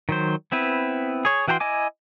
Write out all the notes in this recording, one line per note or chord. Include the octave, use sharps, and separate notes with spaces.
D#3 F#3 C5
B3 C4 E4 B4
G#4 C#5
E3 F#4 G5 A5 C6
E4 D#5 G#5 D6